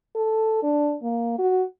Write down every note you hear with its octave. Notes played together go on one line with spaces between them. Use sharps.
A4
D4
A#3
F#4